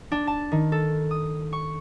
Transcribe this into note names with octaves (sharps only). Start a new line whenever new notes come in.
D4
A5
D#3
A4
D#6
C#6